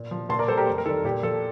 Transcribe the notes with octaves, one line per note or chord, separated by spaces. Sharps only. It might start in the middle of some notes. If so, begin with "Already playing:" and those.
Already playing: A#2
F3
A#2 A5 C6
A#4 D5
G3 A4 C5
G4 A#4
F2
A#4
D#3 G3 A4
A#2 G4
F3 A4